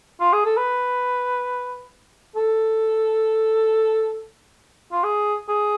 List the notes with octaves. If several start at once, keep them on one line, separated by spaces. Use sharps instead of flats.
F4
G#4
A4
B4
A4
F4
G#4
G#4